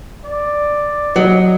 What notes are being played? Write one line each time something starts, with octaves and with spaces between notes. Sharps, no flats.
D5
F#3 D#5